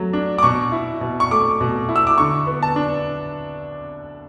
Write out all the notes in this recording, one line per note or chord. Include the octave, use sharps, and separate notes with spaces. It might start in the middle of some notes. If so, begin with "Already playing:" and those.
Already playing: F#3 A3
D4
D6
B2 C#6
E4
B2
C#6
A3 D6
B2
E4
E6
D6
D3 C#6
B3
A5
D4